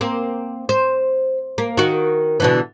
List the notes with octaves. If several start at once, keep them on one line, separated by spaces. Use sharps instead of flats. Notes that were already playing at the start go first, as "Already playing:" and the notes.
A#3 C4
C5
A#3
D#3 F#4
B2 D3 E3